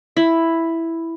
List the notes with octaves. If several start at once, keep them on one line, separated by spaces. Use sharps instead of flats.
E4